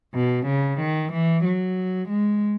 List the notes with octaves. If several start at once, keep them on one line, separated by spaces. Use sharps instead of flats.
B2
C#3
D#3
E3
F#3
G#3